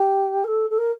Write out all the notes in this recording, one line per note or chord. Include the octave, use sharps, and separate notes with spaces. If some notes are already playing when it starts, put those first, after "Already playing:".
Already playing: G4
A#4
A4
A4
A#4